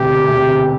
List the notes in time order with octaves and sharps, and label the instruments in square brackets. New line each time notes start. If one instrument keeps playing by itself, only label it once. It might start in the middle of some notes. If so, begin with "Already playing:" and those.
Already playing: [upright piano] E1 D2 C3 [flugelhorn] G4
[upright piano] E1 D2 C3